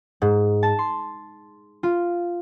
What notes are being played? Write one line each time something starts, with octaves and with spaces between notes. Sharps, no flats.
G#2
A5
C6
F4